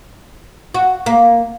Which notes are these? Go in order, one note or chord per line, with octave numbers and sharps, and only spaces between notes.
F#4
A#3